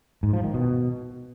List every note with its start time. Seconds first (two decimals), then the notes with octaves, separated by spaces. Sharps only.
0.23 G#2
0.33 F3
0.44 D#3
0.54 B2